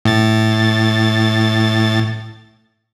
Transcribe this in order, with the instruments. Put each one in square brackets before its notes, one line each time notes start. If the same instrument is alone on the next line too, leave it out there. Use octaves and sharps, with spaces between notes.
[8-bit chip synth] A2 A6